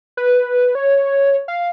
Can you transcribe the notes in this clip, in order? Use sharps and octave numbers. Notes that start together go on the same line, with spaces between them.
B4
C#5
F5